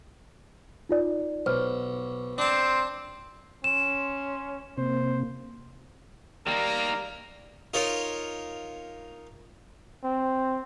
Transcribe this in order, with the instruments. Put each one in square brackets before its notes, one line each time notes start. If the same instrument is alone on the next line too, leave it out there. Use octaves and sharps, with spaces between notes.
[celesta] D#4 F4 D5
[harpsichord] B1 [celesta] C5 F6
[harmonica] C4 [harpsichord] D4 A5
[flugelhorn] C#4 [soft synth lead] C6 [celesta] E7
[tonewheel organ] C3 [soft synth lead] A#3 [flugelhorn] C5
[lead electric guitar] D#3 A#3 [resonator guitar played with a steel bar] G3 [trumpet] A#4
[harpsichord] D#4 F4 A#4 C#5
[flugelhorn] C4